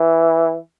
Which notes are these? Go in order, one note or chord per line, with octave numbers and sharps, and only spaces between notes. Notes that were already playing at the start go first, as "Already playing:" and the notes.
Already playing: E3